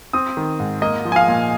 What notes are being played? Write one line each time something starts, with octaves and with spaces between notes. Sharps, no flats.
C4 D#6
D#3
G#2
A#3 D#5
F3
G#5
F5
A#2